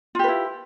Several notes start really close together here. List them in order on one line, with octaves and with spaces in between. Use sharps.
F4 G4 B4 E4